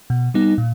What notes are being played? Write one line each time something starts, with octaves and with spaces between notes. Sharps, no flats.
B2
G3 B3 D#4
A#2